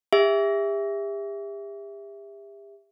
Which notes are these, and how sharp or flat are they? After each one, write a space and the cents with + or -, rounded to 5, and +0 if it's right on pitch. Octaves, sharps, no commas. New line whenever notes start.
G4 +40 E5 +0